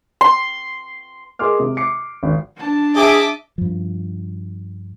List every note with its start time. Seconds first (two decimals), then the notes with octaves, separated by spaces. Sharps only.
0.21 C6
1.39 G#4 A#4 D#5 C6 D6 F6
1.60 C3
1.77 D6 C7 C#7
2.23 G#1
2.57 D4 A5
2.96 G#4 D#5 E5 D6
3.58 G2 F3